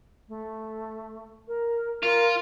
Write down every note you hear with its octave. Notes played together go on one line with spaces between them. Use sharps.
A3
A#4
F4 A#4